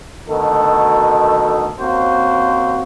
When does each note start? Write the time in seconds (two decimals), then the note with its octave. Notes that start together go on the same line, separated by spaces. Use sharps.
0.28 D2 B2 D#3 D#4 A4
1.80 D#2 A#3 C4 C#4 F#4 C5